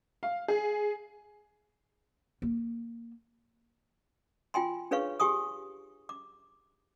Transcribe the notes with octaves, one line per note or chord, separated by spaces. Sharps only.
F5
G#4
A#3
F4 G5 G#5 C6
D4 G#4 B4 C#5 F5 C#6
G4 G#4 G#5 C#6 D#6
D6